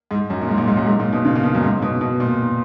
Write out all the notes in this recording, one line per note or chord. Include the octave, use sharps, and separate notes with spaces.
G#2
F#2
A#2
G#2
A#2
G#2
F#2
G#2
A#2
B2
C#3
A#2
B2
F#2
G#2
B2
B2
A#2